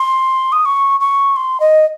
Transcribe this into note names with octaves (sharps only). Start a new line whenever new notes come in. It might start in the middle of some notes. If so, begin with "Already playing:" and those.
Already playing: C6
D#6
C#6
C#6
C6
D#5